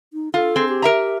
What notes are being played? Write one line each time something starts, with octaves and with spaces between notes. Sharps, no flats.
D#4
F4 A4
C4 G#4
G4
A#4 E5 A#5